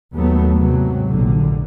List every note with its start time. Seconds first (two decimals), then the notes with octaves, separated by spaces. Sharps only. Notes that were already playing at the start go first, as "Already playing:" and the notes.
0.13 D#2 F#3 A3 B3
0.57 G#2 C3 F#3
1.10 F1 A#1 A#2 D3